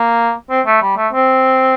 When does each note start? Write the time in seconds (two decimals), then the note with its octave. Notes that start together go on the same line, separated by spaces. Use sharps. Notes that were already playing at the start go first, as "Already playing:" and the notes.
Already playing: A#3
0.50 C4
0.66 A3
0.82 G3
0.97 A3
1.13 C4